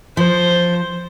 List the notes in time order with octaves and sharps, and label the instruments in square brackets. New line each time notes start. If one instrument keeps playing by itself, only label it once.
[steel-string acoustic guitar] F3 [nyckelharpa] C5